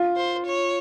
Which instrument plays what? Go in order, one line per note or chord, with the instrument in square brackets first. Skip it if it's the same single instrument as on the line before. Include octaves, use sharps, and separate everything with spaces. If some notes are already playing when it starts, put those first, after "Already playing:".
Already playing: [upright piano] F4
[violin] C5
C#5